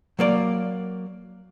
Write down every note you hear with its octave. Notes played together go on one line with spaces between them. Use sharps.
F#3 A#3 D5